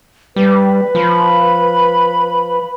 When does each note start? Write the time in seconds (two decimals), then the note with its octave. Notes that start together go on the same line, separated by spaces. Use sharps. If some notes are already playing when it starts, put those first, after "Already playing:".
0.36 G3 B4
0.95 F3 B5